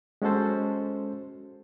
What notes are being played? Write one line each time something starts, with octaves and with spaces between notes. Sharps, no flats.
G#3 C#4 F#4 A4 C5